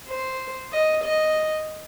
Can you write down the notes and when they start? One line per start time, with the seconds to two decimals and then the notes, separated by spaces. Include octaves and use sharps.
0.08 C5
0.72 D#5
1.04 D#5